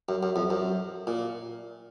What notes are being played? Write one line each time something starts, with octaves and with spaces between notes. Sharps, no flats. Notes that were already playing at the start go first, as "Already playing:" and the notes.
F#2
F#2
F2
F#2
A#2